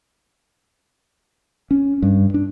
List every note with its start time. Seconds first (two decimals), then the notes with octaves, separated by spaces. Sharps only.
1.71 C#4
2.02 G2
2.34 D4